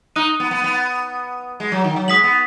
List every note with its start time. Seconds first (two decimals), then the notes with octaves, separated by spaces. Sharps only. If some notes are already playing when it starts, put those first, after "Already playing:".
0.16 D#4 D#6 F#6 D#7
0.40 B3
0.51 B3
0.64 B3
1.60 G#3
1.72 F#3
1.84 D#3
1.96 F#3
2.08 G#3 D#6 B6 F#7
2.24 B3